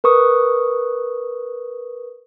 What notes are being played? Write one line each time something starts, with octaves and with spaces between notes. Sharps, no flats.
A#4 B4 C#6 D#6